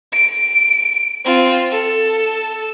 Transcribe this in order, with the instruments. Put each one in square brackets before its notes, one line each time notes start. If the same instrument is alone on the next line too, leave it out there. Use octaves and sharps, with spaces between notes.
[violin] D7
C4 F4
A4